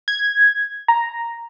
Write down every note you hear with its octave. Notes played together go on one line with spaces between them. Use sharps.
G#6
A#5